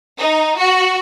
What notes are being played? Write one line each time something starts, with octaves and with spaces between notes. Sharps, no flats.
D#4
F#4